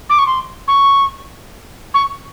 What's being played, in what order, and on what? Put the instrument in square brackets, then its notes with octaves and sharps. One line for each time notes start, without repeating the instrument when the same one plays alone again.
[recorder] D6
C#6
C6
C#6
C#6